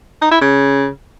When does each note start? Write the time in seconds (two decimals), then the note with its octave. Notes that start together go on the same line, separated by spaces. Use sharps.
0.22 D#4
0.31 E4
0.41 C#3